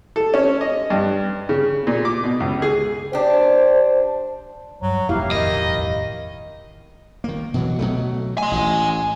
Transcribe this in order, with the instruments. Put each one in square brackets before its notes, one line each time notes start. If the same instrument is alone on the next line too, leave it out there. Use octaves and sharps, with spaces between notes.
[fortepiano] A4
C#4
D#5
G2
C#3
A#2
D6
B2
C#2
G#4
[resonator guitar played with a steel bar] D4 G4 [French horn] C5
[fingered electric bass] G2 [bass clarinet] F#3
[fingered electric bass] E1 A1 F2 [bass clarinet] A#3 [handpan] E4 G4 F5
[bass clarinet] D#3 [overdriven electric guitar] D#5
[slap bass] D#3 A#3
B2 E3 F#3
B2 F#3 A3
[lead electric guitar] G#5 C6
[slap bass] A1